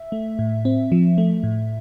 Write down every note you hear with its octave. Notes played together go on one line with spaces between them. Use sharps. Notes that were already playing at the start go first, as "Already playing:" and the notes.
Already playing: E5
A3
A2
C4
F3
A3
A2